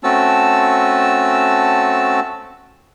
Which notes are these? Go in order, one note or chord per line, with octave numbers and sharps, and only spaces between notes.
A3 C4 C#4 F#4 A5 E6